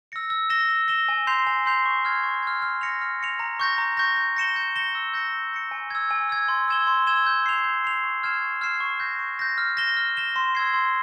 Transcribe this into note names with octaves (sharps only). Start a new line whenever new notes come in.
E6 A#6 C#7
E6
A#6 E7 G7
E6
A#6 E7 G7
G#5
C6 G6 C7 F7
G#5
C6 G6 C7 F7
C#6
F6 G#6
C#6
F6 G#6
F6
A#6 C#7 F7
F6
A#6 C#7 F7
A#5
C#6 G6 A#6
A#5
C#6 G6 A#6
G6
A#6 C#7 E7 G7
G6
A#6 C#7 E7 G7
E6
G6 A#6 C#7
E6
G6 A#6 C#7
G#5
E6 G#6
G#5
E6 G#6
C6
E6 G#6 E7 G7
C6
E6 G#6 E7 G7
G6
C7 F7
G6
C7 F7
C#6
F6 G#6 C7 E7
C#6
F6 G#6 C7 E7
C#6
G6 A#6
C#6
G6 A#6
F6
A#6 E7 G7
F6
A#6 E7 G7
C6
E6 G#6 C7
C6